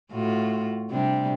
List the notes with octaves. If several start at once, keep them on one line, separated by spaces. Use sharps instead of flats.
A2 F4 F#4
C3 G3 D4